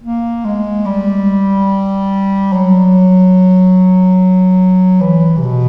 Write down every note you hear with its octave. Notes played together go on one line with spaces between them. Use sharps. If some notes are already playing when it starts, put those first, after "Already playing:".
A#3
G#3
G3
F#3
E3
C3
B2